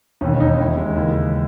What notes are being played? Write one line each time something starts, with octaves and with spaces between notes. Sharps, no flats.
E1 D#2 D#3 C#4
D#4
D#2 D#3 E4
G#3
D#2 C#3 E3